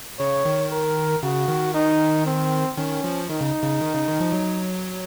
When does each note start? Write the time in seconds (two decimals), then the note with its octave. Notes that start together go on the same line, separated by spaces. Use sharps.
0.19 C#3 C#5
0.45 D#3
0.71 A#4
1.23 C#3 F#4
1.48 D#3
1.74 D#4
2.26 C4
2.77 D#3 C#4
3.04 F3
3.29 D#3 D#4
3.41 C#3
3.63 C#3
3.81 D#3
3.94 C#3
4.07 D#3
4.21 F3
4.32 F#3